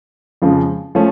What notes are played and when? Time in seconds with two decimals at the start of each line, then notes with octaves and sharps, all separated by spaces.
0.42 F2 C#3 F3 G#3
0.95 F3 A3 C#4